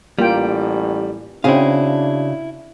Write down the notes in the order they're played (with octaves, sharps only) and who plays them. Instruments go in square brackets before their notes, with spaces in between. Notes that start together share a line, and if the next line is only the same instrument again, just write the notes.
[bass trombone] A1 [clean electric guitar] G3 [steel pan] A#3 F4 G5
[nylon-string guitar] C#3 F#4 G#4 [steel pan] C4 [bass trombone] D4 [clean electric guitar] E4 F5